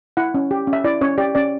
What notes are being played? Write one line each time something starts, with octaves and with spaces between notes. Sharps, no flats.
E4 F#5
C#4
G4
C#4
E5
E4 D5
C#4 C#5
G4 D5
C#4 D5